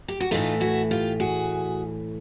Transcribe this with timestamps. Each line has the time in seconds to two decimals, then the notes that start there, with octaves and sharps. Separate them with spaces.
0.08 G4
0.20 F#4
0.31 A2 E3 A3 D#4 F4
0.61 E4 F#4
0.91 F4 G4
1.20 F#4 G#4